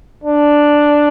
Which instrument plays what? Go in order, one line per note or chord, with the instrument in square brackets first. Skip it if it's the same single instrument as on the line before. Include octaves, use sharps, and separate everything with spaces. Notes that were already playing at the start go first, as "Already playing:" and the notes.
[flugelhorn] D4